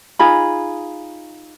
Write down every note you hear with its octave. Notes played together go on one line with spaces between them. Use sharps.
D#4 F4 G#4 B5